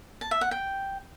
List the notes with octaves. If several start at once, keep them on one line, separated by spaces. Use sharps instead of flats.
A5
E5
F#5
G5